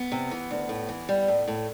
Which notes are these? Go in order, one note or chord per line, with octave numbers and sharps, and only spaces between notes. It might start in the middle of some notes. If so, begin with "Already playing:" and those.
Already playing: B3
C3
E3
D2
A2
E3
G3
A2
A2